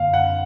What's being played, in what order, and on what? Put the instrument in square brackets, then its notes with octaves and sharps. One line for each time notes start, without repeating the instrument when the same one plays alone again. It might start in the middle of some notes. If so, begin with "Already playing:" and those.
Already playing: [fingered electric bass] F#2 D3 A#3 [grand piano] F5
[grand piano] F#5